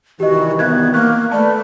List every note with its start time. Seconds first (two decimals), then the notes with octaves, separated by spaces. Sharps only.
0.20 C2 D#3 E3 F#4 G4 D#5
0.59 B3 E5 F#6 G#6
0.94 A#3 C#6 F#6
1.32 A3 B4 D5 A5